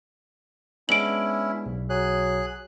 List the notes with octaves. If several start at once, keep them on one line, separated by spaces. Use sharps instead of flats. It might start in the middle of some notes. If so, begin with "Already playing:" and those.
G#3 B3 C#4 D4 E4 D7 F#7
B1
F#3 G#4 F#6